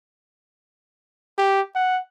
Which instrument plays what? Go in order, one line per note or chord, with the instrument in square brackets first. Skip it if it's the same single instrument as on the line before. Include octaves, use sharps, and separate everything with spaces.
[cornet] G4
F#5